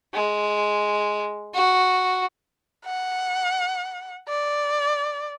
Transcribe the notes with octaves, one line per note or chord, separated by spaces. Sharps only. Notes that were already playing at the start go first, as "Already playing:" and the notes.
G#3
F#4
F#5
D5